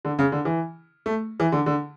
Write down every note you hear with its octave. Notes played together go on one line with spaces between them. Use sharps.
D3
C#3
D3
E3
A3
E3
D3
D3